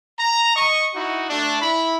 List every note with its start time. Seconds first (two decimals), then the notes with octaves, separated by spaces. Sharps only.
0.18 A#5
0.56 D#5 C#6
0.94 D#4 E4 F#4
1.29 A3 D4
1.61 E4 B5